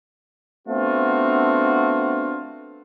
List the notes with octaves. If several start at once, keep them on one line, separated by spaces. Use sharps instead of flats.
A3 B3 C4 D4 F4 F#4